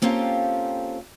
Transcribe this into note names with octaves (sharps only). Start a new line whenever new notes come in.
A#3 C4 C#4 F4 G4 A4